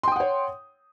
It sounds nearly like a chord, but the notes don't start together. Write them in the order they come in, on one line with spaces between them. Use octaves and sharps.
C6 G5 D#6 F#5 C#5